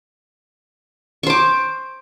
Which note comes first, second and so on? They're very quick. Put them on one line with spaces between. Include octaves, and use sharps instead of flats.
C#6 C5 D6